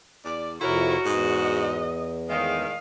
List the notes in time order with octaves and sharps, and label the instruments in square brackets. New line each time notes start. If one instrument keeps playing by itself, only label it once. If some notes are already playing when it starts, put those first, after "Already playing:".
[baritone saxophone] E2 [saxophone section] D5
[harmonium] F2 C3 [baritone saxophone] E4 [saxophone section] F#4 [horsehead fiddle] A#4 C#5
[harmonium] E2 [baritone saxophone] G#2 [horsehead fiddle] D#5
[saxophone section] A2 D#3 [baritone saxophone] G#3 [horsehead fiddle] D#5 F5